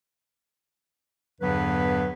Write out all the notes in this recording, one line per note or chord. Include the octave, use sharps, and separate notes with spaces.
E2 G2 D3 F#3 B3 B4